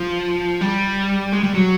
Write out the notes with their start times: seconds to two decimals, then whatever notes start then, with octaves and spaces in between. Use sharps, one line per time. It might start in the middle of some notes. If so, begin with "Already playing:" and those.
Already playing: F3
0.61 G3
1.33 G#3
1.43 G3
1.54 F#3